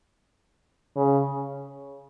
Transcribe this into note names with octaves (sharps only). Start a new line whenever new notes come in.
C#3